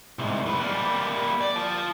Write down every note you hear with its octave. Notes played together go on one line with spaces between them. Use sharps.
C2 G#2
F#2 B4
G3 A#3
D5
F4 A5